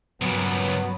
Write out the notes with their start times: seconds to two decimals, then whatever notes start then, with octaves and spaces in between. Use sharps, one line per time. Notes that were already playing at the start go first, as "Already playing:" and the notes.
0.21 C#2 G2 A#2 F#3 B3